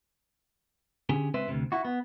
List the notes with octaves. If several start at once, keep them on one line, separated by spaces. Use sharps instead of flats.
D3 C#4 G4 G#4
C#2 C4 B4 C5 E5
D2 G#2 C3
E4 F#4
B3